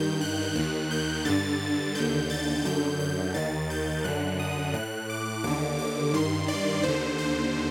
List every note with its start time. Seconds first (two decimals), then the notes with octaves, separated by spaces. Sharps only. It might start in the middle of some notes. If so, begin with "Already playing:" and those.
Already playing: G2 D#3 G6
0.21 F#6
0.56 D#2 D#3 F#6
0.91 G6
1.25 G2 D3 A6
1.95 D#2 D3 G6
2.30 A6
2.65 F#2 D3 G6
3.00 G6
3.34 D#2 D#3 A6
3.70 G6
4.04 F#2 D3 F#6
4.39 D#6
4.73 A2 F#6
5.10 D6
5.44 D#2 D3 D6
5.79 D6
6.14 G2 D#3 C6
6.48 D5
6.83 D#2 D3 C5
7.18 C5